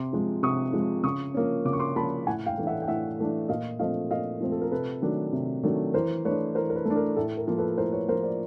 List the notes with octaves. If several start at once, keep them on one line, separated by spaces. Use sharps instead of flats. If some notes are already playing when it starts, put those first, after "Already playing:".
Already playing: C3 C6 D6
F3 G#3
C3 C#6 D#6
F3 G#3
C#3 C#6 D#6
F3 A#3 C#4
C#3 D6
C#6
C6 D6
F3 A#3 C#4 A5 B5
A2 F#5 G#5
F5 G5
E3 A3 D4
E5 F#5
G5
A2 E5 F#5
E3 A3 D4
A#2 D#5 F5
F3 A3 C4 D#5 F5
A#2 D#5 F5
F3 A3 C4
A4
A#4
C3 A4 B4
D#3 F#3 A3 D4
C3
D#3 F#3 A3 D4
E3 A#4 C5
A3 D4 B4 C#5
E3 A#4 C5
A#4
A4 B4
A3 D4
A#4
A2 A4
A#4
F3 A#3
A4 B4
A2 A#4 C5
B4 C#5
F3 A#3 A#4 C5
C5 D5